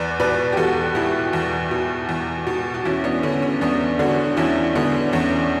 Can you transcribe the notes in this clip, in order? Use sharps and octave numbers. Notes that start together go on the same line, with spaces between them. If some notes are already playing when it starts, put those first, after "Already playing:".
Already playing: E2 B4 D5
B2 B4 D5
G4
E2 F#4 A4
B2 E4 G4
E2
B2
E2
B2
F#4
E2 C#4 E4
B3 D4
D3 C#4
C#4
E2 B3 D4
D3 D4 F#4
E2 C#4 E4
D3 B3 D4
E2 C#4